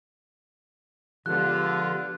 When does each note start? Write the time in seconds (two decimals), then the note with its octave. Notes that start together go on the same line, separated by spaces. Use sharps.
1.26 D3 F3 G#3 B3 F4 G4 F#6